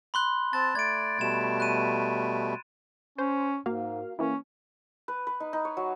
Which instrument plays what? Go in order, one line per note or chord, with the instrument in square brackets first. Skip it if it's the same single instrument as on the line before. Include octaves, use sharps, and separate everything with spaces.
[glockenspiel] B5 C6 F#6
[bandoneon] C4 A5 [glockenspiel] A6
[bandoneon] A3 D5 [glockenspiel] G#6 D7
[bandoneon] B2 G3 A3 [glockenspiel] G#6 E7
[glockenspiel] F#6 D#7
[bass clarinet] C#4 [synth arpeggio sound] C5
[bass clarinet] G#2 [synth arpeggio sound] A#3 F#4 F5
[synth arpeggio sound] E3 A#3 E4 [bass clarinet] C#4
[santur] B4
B4
D#4
D#4
C#5
F#3